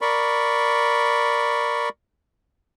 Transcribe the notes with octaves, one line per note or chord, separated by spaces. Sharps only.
A#4 D5 B5 C#6